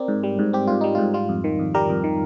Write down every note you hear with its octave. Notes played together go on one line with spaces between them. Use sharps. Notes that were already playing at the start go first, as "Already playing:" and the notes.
Already playing: C4 A#4 D5
G#2
G3
G#2
C4 G4
G#2 F4
G3 D#4
G#2 F4
G3 F4
F2
D#3
F2
G3 G4 A#4
F2
D#3